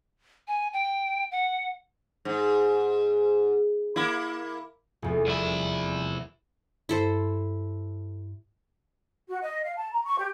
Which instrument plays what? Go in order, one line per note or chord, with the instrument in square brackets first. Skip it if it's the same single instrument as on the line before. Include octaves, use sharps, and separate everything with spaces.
[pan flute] G#5
G5
F#5
[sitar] G#2
A#3 E4
[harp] F1 E2
[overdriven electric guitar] C2 E4
[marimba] G2 [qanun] E4 A4 C5
[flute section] F#4
D#5
F5
A5
A#5
C#6
G4